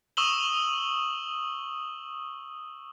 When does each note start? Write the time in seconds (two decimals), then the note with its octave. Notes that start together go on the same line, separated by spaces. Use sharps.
0.17 C#6 D#6 E6 E7 F#7 G7